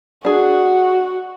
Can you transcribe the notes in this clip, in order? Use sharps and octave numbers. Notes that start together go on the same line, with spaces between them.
D4 F#4 G#4